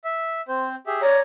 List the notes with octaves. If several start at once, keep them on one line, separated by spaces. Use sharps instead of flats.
E5
C4 C5
G4 G#4 E5
C#5 D5 A#5